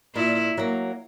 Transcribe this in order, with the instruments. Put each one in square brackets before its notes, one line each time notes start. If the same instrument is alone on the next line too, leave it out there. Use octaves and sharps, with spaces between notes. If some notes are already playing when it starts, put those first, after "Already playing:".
[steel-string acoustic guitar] A#2 [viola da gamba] E4
[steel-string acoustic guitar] F#3 A#3